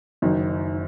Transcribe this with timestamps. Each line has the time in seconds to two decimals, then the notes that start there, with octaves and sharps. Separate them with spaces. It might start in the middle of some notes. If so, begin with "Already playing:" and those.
0.22 F#1 F#2 D#3 D#4